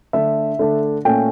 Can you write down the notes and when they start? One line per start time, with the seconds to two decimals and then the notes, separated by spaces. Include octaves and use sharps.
0.13 D3 A3 D4 E5
0.59 D3 A3 D4
1.05 A#2 A3 C#4 G5